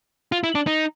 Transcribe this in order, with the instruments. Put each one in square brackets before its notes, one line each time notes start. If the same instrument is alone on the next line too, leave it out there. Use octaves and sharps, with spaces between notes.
[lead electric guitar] F4
E4
D4
D#4